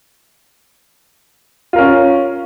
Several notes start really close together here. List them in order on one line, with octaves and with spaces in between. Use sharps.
F4 A#4 C#4